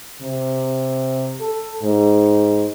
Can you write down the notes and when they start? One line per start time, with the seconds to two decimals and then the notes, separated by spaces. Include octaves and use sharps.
0.22 C3
1.41 A4
1.83 G#2